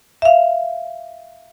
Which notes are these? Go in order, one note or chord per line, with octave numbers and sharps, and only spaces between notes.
E5 F5